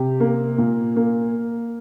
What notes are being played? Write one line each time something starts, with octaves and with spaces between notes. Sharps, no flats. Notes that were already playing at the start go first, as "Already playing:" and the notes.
Already playing: C3 G4
A#3
A#2
A#3